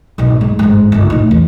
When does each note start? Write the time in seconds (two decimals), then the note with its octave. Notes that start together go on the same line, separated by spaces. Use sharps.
0.18 G#1 B2
0.41 G#3
0.59 G1 G#2
0.92 G1 C#2
1.10 A2 D#4
1.31 E2